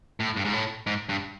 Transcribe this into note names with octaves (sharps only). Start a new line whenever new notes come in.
A2
G2
G#2
A2
G#2
G2